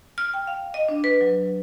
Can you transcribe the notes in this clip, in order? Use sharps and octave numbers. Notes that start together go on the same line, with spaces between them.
F6
G5
F5
D#5
D4
B4
F#3